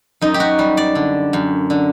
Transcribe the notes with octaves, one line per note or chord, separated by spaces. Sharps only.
F#2 D#4
G4
F#4
G3
D5
D3
F#2
D3